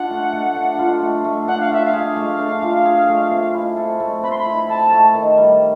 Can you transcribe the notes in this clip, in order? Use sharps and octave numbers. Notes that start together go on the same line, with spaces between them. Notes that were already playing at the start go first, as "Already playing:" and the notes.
Already playing: D4 F4 F#5
A3
A3
D4
F4
A3
A3
D4 F#5
F5
F4 E5
F5
G#4
A3
D4
F4
G#4
A3
C4
E4
A4
A3
C4 B5
C6
B5
E4
A4 A5
A3
D#3
G3